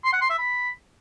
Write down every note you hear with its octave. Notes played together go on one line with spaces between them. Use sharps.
C6
F#5
C6
E5
B5